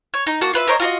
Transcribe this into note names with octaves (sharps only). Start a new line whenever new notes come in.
C#5
D#4
A#3 F#4 A5
F4 B4 E5
A#4 C5 C#5 D#5
F4 F#4 D#5